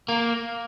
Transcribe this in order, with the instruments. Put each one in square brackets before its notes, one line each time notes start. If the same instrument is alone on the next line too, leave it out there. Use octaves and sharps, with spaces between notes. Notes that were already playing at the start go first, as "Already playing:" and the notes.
[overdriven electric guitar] A#3